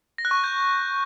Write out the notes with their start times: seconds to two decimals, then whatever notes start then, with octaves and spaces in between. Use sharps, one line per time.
0.18 A#6
0.25 F#6
0.31 C#6
0.37 F#6
0.44 G6